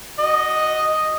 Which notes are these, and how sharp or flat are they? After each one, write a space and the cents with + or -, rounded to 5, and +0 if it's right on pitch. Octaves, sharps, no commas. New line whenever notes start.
F#4 +0 D#5 +0